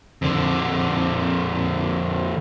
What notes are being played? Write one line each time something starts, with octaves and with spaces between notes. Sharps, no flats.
F2 D3